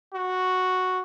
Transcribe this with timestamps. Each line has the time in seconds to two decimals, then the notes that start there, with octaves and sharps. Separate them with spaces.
0.13 F#4